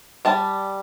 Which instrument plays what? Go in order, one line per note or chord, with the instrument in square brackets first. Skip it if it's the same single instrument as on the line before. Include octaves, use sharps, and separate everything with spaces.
[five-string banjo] G3 A5